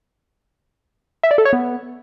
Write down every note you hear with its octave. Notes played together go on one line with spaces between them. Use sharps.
E5
D5
A4
C#5
B3